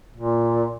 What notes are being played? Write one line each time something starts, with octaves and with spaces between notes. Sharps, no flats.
A#2